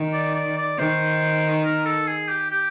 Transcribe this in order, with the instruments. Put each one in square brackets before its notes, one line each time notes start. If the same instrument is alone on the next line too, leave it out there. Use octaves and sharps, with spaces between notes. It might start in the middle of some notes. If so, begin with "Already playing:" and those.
Already playing: [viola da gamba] D#3
[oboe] D5
D5
D5
[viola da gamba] D#3 [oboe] C5
[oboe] A#4
A4
G#4
G4
G4